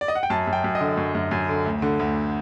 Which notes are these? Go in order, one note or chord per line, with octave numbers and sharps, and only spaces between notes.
D5
D#5
F#5
G5
F#2 A5
F#2
G5
F#2
D#5
D3
F#2
F#2
F#2
D3
D2
D3
D2